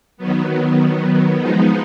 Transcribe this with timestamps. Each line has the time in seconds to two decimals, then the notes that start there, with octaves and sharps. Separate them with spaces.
0.17 D#3 F#3 B3
1.38 F3 G#3 B3 D#4